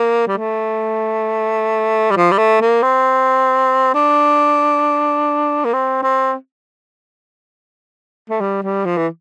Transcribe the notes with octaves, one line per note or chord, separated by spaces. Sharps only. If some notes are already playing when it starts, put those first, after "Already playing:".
Already playing: A#3
G3
A3
G3
F3
G3
A3
A#3
C4
D4
A#3
C4
C4
A3
G3
G3
F3
E3